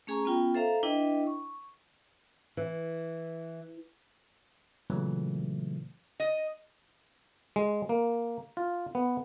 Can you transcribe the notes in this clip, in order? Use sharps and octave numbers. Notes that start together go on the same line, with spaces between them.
A3 C#4 G#4 G#5 A#5 C#6
B3 C#4 F4 G5
A4 C5 E5 F5 A#5
D4 E4 B4 D#5 E5 G5
C#6
E3
A#2 C#3 E3 F#3 A3
D#5
G#3
A#3
F4
B3